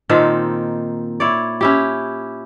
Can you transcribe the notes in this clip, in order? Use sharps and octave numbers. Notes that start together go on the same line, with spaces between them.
A#2 D#3 C4 A4
E4 C#5 D5
C#4 E4 G4